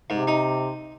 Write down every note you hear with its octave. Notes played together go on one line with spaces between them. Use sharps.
G#2 C3
D#4